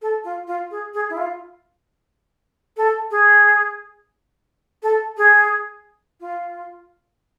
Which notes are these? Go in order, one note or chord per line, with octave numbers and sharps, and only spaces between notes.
A4
F4
F4
G#4
G#4
E4
F4
A4
G#4
A4
G#4
F4